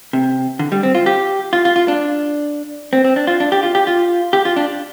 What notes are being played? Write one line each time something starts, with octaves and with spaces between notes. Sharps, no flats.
C3
D3
G3
C4
F4
G4
F4
F4
F4
D4
C4
C4
D4
F4
D4
G4
F4
G4
F4
G4
F4
D4